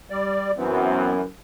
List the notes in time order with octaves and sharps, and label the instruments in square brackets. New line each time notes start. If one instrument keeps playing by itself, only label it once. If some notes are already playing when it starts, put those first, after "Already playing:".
[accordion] G3 D5
[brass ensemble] F#2 E3 [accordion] B3 C4